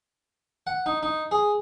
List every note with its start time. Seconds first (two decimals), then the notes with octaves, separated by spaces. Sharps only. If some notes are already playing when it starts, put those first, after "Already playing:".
0.67 F#5
0.86 D#4
1.03 D#4
1.31 G#4